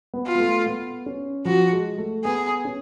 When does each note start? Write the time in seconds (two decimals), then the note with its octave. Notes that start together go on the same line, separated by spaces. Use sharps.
0.14 B3
0.26 F4
0.35 B3
0.40 A3
0.66 B3
1.06 C#4
1.45 F3 F#4
1.72 G#3
1.98 A3
2.25 B3 G#4
2.65 C#4